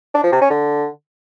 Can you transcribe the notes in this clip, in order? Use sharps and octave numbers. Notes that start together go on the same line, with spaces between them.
D4
F3
C3
C#4
D3